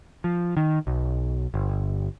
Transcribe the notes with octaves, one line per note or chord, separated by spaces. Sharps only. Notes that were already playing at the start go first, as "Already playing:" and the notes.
F3
D#3
B1
G1